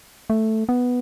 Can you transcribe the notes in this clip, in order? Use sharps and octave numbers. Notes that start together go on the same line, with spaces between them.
A3
B3